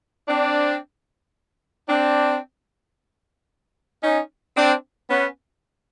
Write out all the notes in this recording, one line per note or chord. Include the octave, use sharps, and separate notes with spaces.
C4 D4
C4 D4
C#4 D#4
C4 D4
B3 C#4